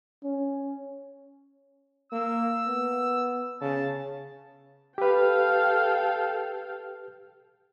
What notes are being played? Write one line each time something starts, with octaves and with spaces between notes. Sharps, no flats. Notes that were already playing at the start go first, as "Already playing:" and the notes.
C#4
A#3 E6
B3
C#3 A5
G4 A4 B4 F5 G5